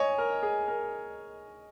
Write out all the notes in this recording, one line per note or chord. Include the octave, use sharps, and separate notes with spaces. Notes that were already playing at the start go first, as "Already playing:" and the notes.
Already playing: C#5 D#5 G#5
A#4
G#4
A#4